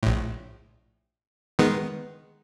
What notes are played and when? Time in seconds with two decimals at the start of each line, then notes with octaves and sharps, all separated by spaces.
0.03 A#1 A2
1.59 D#3 G#3 B3